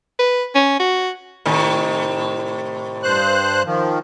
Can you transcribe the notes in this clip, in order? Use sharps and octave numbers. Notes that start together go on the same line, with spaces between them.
B4
C#4
F#4
A2 C3 D#3
G2 C5 F#6
D#3 F3